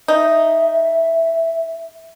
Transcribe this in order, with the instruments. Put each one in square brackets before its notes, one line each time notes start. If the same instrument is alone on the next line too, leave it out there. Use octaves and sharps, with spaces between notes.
[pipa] D#4 [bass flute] E5